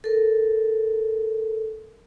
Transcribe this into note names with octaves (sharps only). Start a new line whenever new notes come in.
A4 A#4